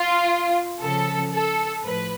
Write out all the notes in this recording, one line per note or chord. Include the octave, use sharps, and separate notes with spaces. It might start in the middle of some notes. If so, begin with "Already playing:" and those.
Already playing: F4
C#3 F3 A4
A4
A2 F3 B4